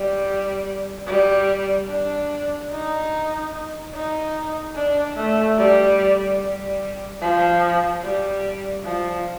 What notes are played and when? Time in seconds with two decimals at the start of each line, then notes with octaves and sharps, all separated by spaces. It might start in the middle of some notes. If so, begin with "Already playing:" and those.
Already playing: G3
1.07 G3
1.89 D4
2.70 D#4
3.93 D#4
4.75 D4
5.16 A3
5.57 G3
6.39 G3
7.21 F3
8.03 G3
8.84 F3